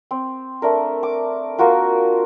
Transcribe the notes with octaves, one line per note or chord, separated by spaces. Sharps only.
C4
A3 D4 A#4
D6
A#3 F4 F#4 A#4